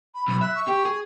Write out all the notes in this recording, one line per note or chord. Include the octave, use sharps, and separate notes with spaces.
B5
B1 B5
E5 F#6
C#6
G4
G#4